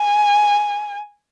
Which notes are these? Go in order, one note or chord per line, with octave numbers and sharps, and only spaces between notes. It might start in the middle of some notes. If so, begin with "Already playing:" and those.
Already playing: G#5